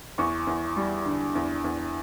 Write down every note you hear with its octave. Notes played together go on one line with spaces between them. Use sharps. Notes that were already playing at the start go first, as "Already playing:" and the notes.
E2 C#6
E2
G3
D3
E2
E2